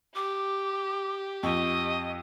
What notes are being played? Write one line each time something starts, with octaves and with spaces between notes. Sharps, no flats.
G4 D6
F2 D#5 C#6